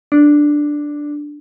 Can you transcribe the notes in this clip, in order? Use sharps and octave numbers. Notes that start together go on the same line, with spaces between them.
D4